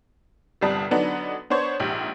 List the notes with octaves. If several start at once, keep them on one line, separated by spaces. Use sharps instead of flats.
G1 C2 G3 A5 D#6
D3 F#3 B3 D4 D#4
B3 D4 C5 C#5
A#1 G#2 G4